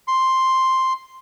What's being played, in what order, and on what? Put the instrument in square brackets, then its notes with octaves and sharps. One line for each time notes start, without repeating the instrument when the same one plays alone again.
[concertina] C6